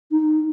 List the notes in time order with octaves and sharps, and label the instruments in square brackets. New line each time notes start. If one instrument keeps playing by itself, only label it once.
[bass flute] D#4